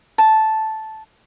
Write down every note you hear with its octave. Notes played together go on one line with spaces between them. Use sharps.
A5